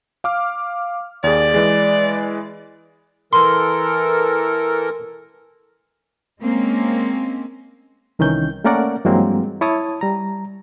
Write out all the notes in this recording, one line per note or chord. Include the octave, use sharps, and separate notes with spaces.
F5 D6 F6
D#2 G#4 D5
E3 G#3
E3 A4 A#4 C6
G#3 A#3 C4 C#4
C2 D#3 E3 C#4 G6
A3 A#3 C#4 A#4 D5 F#5
G2 E3 F#3 G#3 A#3 C4
E4 C#5 A5 D#6
G3 A#5